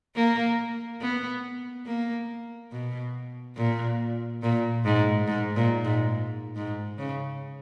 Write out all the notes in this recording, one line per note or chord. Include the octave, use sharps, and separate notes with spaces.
A#3
B3
A#3
B2
A#2
A#2
G#2
G#2
A#2
G#2
G#2
C#3